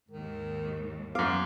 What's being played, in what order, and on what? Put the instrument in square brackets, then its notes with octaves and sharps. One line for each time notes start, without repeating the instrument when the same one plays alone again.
[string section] D#2 G#2 [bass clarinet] D#3
[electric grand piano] F#2 D6 [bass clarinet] B3 [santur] F5